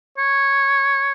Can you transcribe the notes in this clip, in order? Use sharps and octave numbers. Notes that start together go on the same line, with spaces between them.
C#5